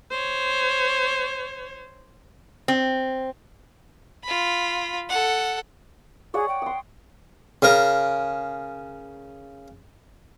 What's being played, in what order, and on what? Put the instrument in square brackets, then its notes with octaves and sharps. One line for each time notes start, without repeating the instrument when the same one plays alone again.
[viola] C5 C#5
[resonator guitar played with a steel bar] C4
[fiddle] F4 B5
A4 F#5
[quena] G#4 [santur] C#5 D5 F#5
[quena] G5
[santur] C6 D#6
[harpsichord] C#3 A#4